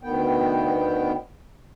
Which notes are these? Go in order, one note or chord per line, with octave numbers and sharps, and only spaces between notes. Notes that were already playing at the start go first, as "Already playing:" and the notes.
D2 D#3 B3 G5